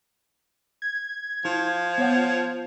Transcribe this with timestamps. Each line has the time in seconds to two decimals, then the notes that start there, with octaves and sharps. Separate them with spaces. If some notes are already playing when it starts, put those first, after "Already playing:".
0.82 G#6
1.45 F3 E4
1.98 B3 C#5 F#5